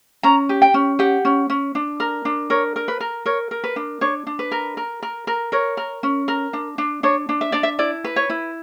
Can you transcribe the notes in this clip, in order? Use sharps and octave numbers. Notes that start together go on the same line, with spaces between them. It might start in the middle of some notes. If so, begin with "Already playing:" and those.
C#4 A#5
G4
G5
C#4
G4 F#5
C#4
C#4
D4
A#4
D4
A#4 C#5
A#4
B4
A#4
A#4 C#5
A#4
B4
D4
D4 C#5
D4
B4
A#4
A#4
A#4
A#4
A#4 C#5
A#4
C#4
A#4
D4
D4
D4 C#5
D4
E5
D4 D5
E5
E4 D5
B4
C#5
E4